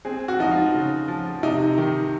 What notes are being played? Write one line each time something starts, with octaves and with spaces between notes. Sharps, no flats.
C4 G#4
F#4
F3 D#4
F4
C#3
F3
C3 D#4
D#3